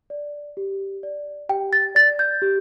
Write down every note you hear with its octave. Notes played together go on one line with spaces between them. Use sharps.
D5
G4
D5
G4 G5
A6
D5 A6
G6
G4